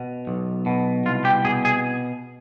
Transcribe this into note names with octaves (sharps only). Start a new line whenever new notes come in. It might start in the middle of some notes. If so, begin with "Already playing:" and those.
Already playing: B2
B1
B2
C2 F4
G4
B2 G#4
G#4